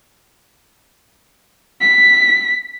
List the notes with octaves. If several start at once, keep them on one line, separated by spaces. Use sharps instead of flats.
B6